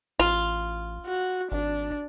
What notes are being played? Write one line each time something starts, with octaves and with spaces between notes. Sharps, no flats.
A1 F4
F#4
G#1 D4